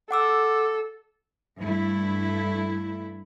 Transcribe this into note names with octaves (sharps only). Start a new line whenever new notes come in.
A4 F#5 D6 E6
G2 A3 E4